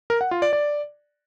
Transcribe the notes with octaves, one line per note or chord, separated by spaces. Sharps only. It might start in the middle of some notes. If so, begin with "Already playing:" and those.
A#4
F#5
F4
D5
D5